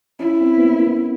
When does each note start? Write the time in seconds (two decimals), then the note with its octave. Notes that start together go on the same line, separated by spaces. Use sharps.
0.19 C#4 E4
0.41 C4
0.58 B3
0.65 A#3
0.87 B3